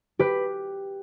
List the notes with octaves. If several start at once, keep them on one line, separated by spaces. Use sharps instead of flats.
G4 B4